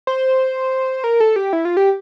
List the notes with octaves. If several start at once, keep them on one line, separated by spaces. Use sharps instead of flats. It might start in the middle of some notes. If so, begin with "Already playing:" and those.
C5
A#4
A4
G4
E4
F4
G4